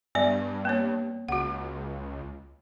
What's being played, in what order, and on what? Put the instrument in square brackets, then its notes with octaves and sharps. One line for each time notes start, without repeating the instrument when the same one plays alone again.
[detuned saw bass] G2 [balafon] G3 B3 D5
[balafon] A#3 C4 C#5
[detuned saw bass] C#2 [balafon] F#4 F#5